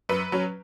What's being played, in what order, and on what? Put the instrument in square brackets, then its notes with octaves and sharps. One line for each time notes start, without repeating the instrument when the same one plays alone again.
[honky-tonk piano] F#2 B4
F#3 C#4